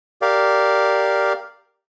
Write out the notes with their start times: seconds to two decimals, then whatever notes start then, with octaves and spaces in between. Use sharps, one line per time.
0.22 G4 A#4 D5 F5